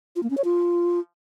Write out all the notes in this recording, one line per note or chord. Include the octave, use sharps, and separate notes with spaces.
F4
A#3
C#4
C#5
F4